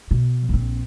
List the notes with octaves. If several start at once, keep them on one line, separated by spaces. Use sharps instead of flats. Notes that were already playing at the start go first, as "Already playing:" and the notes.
B2
A#1 C4